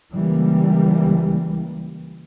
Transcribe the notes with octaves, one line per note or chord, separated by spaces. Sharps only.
C#2 E3 G3 A#3